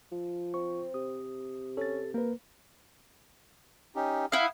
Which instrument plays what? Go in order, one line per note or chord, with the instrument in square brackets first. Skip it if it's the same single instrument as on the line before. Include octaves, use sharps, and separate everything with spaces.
[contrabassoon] F3
[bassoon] C4 [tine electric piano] C#6
[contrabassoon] C3 [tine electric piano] D#6
[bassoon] C#4 [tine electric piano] A4 A6
[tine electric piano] A#3 B4 [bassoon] A#4
[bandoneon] C#4 D#4 G4
[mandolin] E4 F5 [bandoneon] F#5 D#6